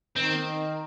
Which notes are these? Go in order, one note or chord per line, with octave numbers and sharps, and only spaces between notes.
D#3 C4